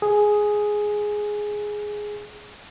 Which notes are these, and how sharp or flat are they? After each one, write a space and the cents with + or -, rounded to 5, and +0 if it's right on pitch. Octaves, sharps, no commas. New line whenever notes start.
G#4 +5